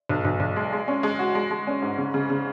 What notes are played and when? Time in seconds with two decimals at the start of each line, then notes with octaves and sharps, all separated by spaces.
0.09 B1
0.25 B1
0.40 B1
0.56 G#3
0.72 G#3
0.88 C#4
1.03 G#3
1.19 F#4
1.35 G#3
1.51 G#3
1.67 C#4
1.82 G#2
1.98 C#3
2.14 C#3
2.30 C#3